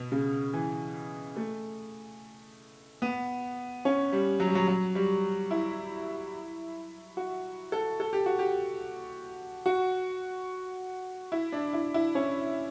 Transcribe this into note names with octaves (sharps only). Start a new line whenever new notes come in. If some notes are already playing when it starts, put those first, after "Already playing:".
Already playing: B2
C#3
E3
A3
B3
C#4
G3
F#3
G3
F#3
F#3
G3
E4
F#4
A4
A4
G4
F#4
G4
F#4
E4
D4
E4
E4
C#4